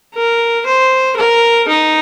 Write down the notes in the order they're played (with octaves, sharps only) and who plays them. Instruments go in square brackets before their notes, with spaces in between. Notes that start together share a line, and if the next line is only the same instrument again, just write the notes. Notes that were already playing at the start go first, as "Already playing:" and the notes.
[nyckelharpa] A#4
C5
A#4
D#4